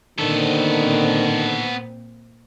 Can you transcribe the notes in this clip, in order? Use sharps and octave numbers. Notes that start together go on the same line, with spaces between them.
A#2 D3 D#3 B3 C4 A4